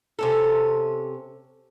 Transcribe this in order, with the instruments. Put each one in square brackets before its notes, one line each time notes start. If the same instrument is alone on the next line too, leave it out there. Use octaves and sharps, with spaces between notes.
[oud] C3 C#4 A4